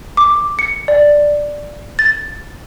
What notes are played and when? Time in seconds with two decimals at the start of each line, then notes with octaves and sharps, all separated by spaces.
0.17 D6
0.59 C#7
0.88 D5
1.99 A6